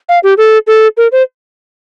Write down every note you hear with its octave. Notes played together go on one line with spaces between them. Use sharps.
F5
G4
A4
A4
A#4
C5